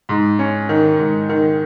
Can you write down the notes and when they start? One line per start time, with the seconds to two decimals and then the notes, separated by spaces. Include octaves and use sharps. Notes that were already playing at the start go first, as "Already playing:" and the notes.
0.09 G#2
0.39 C#4
0.69 D#3
0.99 G#2
1.29 D#3